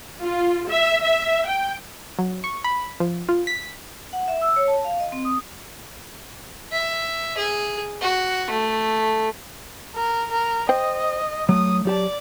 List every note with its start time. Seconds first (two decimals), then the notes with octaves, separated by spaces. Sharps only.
0.21 F4
0.69 E5
1.02 E5
1.47 G5
2.19 F#3
2.44 C#6
2.64 B5
3.00 F3
3.29 F4
3.47 B6
4.13 F#5
4.28 E5
4.41 E6
4.56 C#5
4.68 A5
4.85 F5
5.00 D#5
5.12 C4
5.25 D#6
6.72 E5
7.37 G#4
8.02 F#4
8.50 A3
9.95 A#4
10.30 A#4
10.69 C5 D#5 G5
11.49 F#3 A3 D#6
11.85 F#3 G4 D5 A5